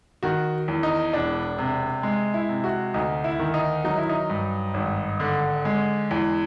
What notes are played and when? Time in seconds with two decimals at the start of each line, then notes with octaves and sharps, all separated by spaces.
0.23 D#3 F#4
0.68 E2
0.83 D#4
1.13 E1 D4
1.58 C3
2.03 G#3
2.34 E4
2.49 C3
2.64 F#4
2.94 D2 D#4
3.24 E4
3.39 D#3
3.54 D#4
3.84 F#3 D#4
3.97 E4
4.09 D#4
4.30 G2
4.74 G#1
5.20 D3
5.65 G#3
6.11 E2